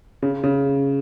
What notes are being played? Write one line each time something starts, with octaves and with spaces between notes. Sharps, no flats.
C#3
C#3